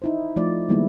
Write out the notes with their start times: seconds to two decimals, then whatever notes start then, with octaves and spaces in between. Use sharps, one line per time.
0.02 D#4 E4 C5
0.36 F3 A3 D#4 F4 D5
0.69 D#3 G3 G#3 A#3 B3 E4